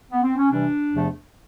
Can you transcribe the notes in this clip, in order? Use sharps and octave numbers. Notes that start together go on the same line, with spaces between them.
B3
C4
C#4
C3 E3 G3 D4
E2 C3 F3 A3